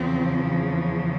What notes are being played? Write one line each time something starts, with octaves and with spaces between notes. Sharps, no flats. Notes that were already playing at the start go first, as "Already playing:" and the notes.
Already playing: E2 C#3 F3 C4